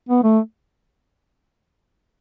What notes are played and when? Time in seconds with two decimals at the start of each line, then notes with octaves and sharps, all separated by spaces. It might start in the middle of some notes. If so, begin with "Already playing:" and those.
0.09 B3
0.24 A3